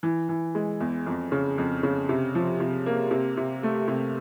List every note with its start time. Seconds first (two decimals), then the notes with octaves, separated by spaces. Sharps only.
0.03 E3
0.29 E3
0.55 G#3
0.80 E2
1.07 F2
1.32 C#3
1.58 F2
1.83 C#3
2.09 C3
2.35 F3
2.60 C3
2.86 A#3
3.11 C3
3.37 C3
3.63 A3
3.88 C3